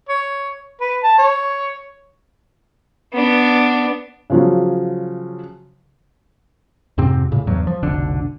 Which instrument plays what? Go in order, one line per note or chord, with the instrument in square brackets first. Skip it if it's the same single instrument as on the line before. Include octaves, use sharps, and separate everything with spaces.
[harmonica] C#5
B4
A5
C#5
[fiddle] B3 D4
[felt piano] C#3 F3 F#3
[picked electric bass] F2 G#2 C3 C4
A2 C#3
E2 G2 F#3
F3
F1 B1 D3 D4